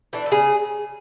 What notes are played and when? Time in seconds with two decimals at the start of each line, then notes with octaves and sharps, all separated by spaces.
0.13 E3 A3 D4
0.26 A4
0.32 C#3 G#4